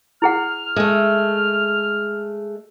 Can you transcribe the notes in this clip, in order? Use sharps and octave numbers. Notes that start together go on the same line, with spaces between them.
E4 G#4 F#5 F6
G#3 A3